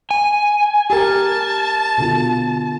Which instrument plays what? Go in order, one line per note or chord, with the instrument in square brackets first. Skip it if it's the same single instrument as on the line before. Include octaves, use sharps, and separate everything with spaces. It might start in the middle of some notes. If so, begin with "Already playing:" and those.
[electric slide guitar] G#5
[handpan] G4 A#4 [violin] A5
[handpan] B2 D3 F4